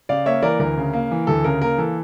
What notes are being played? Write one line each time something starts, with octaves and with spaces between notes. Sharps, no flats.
C#3 D5 F5
A#3 C#5 E5
E3 A#4 D5
D2 A#4
C#3
A#3
E3
D2 A4
C#3 A#4
A#3 A#4
E3 A4